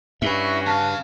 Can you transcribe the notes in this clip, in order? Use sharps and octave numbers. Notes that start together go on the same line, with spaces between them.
G2 C#4 F#4 E5 B5
C#3 F5 A5